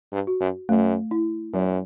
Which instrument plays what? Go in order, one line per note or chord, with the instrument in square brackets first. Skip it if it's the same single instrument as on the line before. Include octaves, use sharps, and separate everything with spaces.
[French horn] G2
[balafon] F#4
[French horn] F#2
[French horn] F#2 [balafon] A3
[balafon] E4
[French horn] F#2 [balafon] F#3